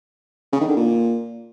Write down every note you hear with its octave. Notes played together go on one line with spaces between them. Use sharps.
C#3
D#3
D3
A#2